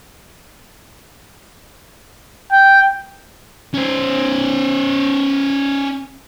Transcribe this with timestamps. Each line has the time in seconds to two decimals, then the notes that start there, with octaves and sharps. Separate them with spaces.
2.52 G5
3.74 C#4 C5